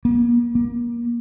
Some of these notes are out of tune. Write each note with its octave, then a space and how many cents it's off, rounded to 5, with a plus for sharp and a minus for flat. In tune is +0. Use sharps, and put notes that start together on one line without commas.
A#3 +40
A#3 +25